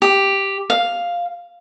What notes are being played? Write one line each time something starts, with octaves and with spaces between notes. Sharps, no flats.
G4
F5